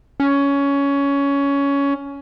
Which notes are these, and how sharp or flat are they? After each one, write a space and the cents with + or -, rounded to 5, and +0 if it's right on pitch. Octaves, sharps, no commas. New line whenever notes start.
C#4 +15